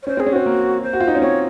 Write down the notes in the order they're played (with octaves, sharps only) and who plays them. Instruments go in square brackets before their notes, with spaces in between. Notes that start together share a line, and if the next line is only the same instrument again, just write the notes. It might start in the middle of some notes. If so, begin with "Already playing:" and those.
[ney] C#5
[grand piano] C#4 [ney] C5
[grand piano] C4 [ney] G#4
[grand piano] C#4
[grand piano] C4 [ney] F#4
[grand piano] A#3
[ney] C5
[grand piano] F#4
F4
D#4
C#4
[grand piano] C4 [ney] C#5